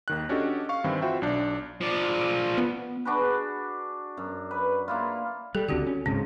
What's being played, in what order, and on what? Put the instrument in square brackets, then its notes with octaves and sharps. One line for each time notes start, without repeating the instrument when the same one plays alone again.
[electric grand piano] D#2 D#3 F#6
C#4 D4 F#4 G4 A4 D#5
F5 C#6
G2 D#3 E3 C4 E4
F4 F#4 C5 E5 G5
B1 D4 D5
[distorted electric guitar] F3 D5
[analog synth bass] B3
[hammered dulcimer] D4 F#4 G#4 B4
F#2
B4
A#3 E4 F4
[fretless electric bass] G3 [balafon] G4 A4
[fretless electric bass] C#2 D3 [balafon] C4 F#4 G4
[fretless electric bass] C#4
[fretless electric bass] D1 G#2 C#3 [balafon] C4